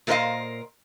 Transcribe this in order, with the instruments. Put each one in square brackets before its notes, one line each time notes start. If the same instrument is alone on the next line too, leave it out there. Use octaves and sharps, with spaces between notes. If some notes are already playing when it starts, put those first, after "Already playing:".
[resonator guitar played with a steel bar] A#2 A3 A#4 C5 D#5 F5